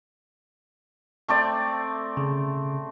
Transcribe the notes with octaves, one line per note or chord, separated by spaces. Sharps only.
A3 C4 D5
C#3